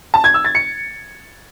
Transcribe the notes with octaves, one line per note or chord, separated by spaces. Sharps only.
A5
G#6
E6
A6
C#7